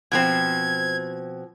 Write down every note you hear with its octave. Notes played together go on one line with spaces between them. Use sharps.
B2 F3 C4 G#6